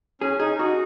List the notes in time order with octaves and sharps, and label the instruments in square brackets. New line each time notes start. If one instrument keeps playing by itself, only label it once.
[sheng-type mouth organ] C#4 [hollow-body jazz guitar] G#4
[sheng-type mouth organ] D#4 [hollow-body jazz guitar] G#4
[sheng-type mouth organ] D#4 [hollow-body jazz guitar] F#4